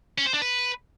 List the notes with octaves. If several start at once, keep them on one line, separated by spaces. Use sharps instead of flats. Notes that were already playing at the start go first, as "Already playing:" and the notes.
C#4
C5
D4
B4